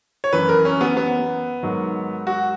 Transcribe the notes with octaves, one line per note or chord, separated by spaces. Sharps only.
C#5
F#2 E3 B4
A#4
C#4
B3
B3
G#2 D#3 F#3
F#4